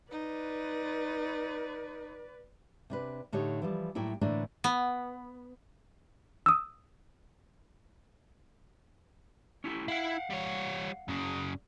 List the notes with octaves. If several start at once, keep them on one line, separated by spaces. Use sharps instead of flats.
D#4 B4 D5
C3 D4 B4
A2 D3 D#4 G4 C#5
E3 F3 G3
A2 F#3 A#3 E4 G5
A2 D3 E3 A3 A#3 D4
B3
D#6 E6
C#4 E4 G4
E4 F5 F#5
G3 C#5
F#2 C#3